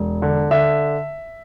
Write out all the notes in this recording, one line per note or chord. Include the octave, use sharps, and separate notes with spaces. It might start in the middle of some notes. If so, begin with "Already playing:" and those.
Already playing: E1
D3
D3 E5